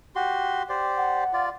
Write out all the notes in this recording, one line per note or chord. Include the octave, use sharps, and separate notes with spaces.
F#4 G4 C6
G4 C5 D5
F#5
F4 D5